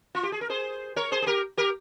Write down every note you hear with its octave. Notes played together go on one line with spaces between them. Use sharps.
F4
G4
G#4
A#4
G#4 C5
A#4 C#5
G#4 C5
G#4
G4 A#4
G4 A#4